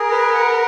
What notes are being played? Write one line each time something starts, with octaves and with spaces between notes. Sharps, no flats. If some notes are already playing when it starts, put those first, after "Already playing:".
Already playing: G#4 A#4
B4
F#5